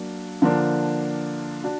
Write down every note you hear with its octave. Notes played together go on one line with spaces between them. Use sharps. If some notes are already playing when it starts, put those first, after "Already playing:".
Already playing: F#3 A#3 D4
D3 F3 A#3 D4
D4 F#4